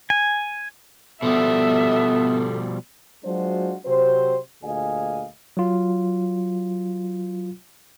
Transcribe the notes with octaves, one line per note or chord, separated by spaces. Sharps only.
G#5
B2 F3 G3 B3 A4 E5
F#3 G#3 D4 F4 F#4 C5
C3 F#3 C4 C5
D2 A#2 G#4 D#5 F5 G#5
F#3 F4